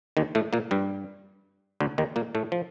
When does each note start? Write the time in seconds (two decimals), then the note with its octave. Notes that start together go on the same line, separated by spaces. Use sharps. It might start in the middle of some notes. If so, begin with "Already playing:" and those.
0.17 D#2 D#3
0.35 A2 A3
0.53 A#2 A#3
0.71 G2 G3
1.80 D2 D3
1.98 D#2 D#3
2.16 A#2 A#3
2.35 A2 A3
2.52 F3